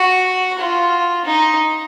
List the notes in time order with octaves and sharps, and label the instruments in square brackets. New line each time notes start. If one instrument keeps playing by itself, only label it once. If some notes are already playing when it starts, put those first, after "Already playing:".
Already playing: [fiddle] F#4
F4
D#4